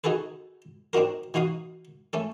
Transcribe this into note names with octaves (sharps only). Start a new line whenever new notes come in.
D#4 F#4 G#4 A4 B4
C4 D4 D#4 F#4 A#4
E3 D#4 F#4 F5 D#6
A3 C#4 A4